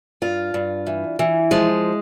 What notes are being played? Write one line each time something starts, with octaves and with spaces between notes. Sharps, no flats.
G2 F4
G2
E3
E3
F3 G#3